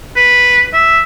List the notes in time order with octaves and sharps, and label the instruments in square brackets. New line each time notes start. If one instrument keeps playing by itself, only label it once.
[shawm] B4
E5